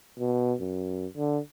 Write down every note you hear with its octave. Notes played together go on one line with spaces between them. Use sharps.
B2
F#2
D3